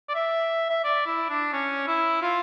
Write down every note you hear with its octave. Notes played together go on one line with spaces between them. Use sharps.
D5
E5
E5
D5
E4
D4
C#4
E4
F4